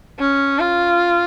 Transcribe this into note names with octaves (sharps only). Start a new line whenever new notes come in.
C#4
F4